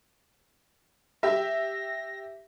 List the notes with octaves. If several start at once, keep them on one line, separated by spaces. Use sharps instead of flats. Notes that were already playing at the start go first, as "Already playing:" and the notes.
G4 E5 A#6